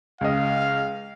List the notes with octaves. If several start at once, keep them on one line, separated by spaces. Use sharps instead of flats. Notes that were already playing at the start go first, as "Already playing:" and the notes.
C#2 D#5 F5